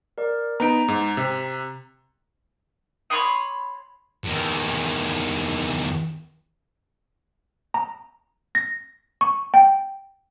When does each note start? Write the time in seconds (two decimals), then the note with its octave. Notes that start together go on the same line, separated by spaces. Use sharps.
0.18 A#4 D5
0.60 B3 D#4 A#5 D7
0.88 G#2
1.17 C3
3.10 C#5 B5 C6 D#6
4.24 E2 D#3
7.74 A#5
8.55 A#6
9.21 C#6
9.54 G5